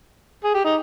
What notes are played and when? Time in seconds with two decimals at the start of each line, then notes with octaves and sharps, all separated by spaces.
0.44 G#4
0.54 G4
0.65 D#4